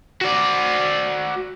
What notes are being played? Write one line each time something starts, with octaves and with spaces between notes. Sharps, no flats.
F#4 D5